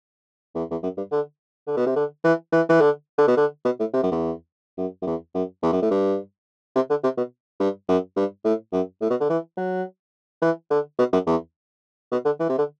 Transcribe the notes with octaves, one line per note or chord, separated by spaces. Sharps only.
E2
E2
F#2
G2
D3
D3
B2
C3
D3
E3
E3
E3
D3
D3
B2
D3
B2
A2
C3
F#2
E2
F#2
F#2
E2
F#2
E2
F#2
A2
G2
C3
D3
C3
B2
G2
F#2
G2
A2
F#2
A2
B2
D3
E3
F#3
E3
D3
B2
F#2
E2
B2
D3
E3
C3
D3